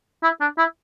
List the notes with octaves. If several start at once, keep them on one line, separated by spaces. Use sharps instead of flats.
E4
D4
E4